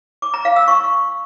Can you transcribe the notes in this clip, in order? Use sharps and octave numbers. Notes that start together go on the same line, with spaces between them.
D6
A#5
F5
E6
C#6